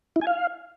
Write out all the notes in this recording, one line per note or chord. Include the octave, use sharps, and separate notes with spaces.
E4
G#5
F5